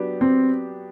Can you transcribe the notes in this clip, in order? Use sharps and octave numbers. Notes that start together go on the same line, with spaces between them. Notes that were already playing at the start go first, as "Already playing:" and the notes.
Already playing: F#3 B3 D4 G4
C4